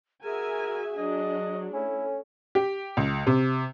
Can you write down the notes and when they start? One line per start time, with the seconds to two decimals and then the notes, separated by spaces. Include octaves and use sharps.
0.24 F#4 G#4 A#4 E5 G#5
0.98 F#3 D4 D#5
1.74 A3 C#4 E4
2.55 G4
2.97 C#2
3.27 C3